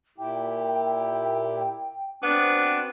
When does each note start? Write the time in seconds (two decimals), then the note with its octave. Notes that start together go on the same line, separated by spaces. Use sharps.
0.18 A#2 E4 G4 G5
2.23 B3 C4 D4 F#4